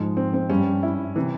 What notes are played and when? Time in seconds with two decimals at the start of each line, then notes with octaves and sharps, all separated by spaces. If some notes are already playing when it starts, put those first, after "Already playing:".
Already playing: G#2 F3 G#3
0.17 C4
0.34 C4
0.50 G2 G3 C#4
0.83 E4
1.16 C3 E3